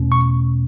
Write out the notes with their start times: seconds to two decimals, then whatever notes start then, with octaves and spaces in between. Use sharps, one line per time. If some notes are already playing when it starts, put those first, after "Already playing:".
Already playing: E2 B2 A3 C#4
0.12 C#6